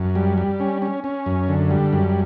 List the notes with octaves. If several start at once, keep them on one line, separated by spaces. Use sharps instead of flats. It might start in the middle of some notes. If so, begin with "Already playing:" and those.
Already playing: F#2
G3
G3
C#4
C#4
C#4
F#2
D3
G3
F#2